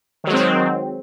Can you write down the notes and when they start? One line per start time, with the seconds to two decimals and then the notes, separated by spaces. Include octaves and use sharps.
0.24 D#3
0.27 F#3
0.30 G#3
0.33 C4